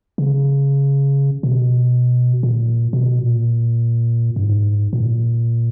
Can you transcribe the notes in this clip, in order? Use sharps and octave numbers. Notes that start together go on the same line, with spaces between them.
C#3
B2
A#2
B2
A#2
G2
G#2
A#2